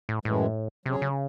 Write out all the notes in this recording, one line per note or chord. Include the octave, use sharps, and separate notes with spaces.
A2
F#2 A2 E3 G#3
C3 F#3 C#4 G#4 C#5
C#3